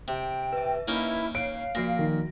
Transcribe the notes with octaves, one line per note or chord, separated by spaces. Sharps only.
C3 G5
B4 E5
A#3 C#4 D#4 E4
C#5 F5 D7
A#2 F3 F#4 A#6
D#3